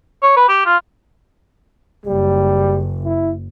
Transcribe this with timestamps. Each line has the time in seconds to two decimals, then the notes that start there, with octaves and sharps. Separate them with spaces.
0.22 C#5
0.37 B4
0.49 G4
0.66 F4
2.06 F#1 G3
3.04 E4